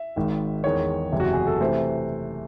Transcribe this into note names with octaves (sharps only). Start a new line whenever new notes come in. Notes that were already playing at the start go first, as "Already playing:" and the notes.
Already playing: E5
G#1 G#2 D#3
E2 D#3 G#3 C#5
F#1 E2 C3 E3 G#3
F#4
G#4
A4
C3 E3 A3 C5